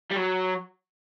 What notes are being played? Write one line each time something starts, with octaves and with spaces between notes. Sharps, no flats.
G3
F#3